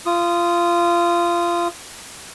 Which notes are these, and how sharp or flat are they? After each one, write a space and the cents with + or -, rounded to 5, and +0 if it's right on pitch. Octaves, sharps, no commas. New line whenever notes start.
F4 -20 D#6 +0